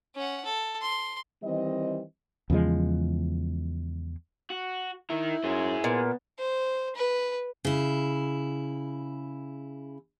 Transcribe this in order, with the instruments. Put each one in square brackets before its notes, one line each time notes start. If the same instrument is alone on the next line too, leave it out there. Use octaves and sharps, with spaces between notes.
[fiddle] C#4 F#5
A4
C6
[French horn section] D#3 E3 G3 C4 D#5
[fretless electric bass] E2 C#3 F3 G#3
[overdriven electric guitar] F#4
[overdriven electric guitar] D#4 A#4 [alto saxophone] E4
[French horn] F#2 [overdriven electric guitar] G#4 C5
[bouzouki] A#2 [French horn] B3
[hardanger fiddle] C5
B4
[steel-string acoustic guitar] C#3 E4